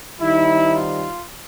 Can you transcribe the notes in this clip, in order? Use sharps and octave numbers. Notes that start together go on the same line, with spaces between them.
D#3 G3 C4 D#4 E4
F4